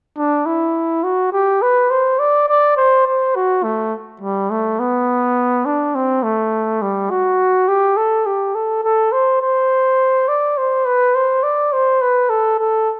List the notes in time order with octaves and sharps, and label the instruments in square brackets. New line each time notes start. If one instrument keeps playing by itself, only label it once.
[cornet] D4
E4
F#4
G4
B4
C5
D5
D5
C5
C5
F#4
A3
G3
A3
B3
D4
C4
A3
G3
F#4
G4
A4
G4
A4
A4
C5
C5
D5
C5
B4
C5
D5
C5
B4
A4
A4